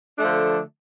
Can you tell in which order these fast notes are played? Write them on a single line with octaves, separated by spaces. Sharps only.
D4 A3 F3 D3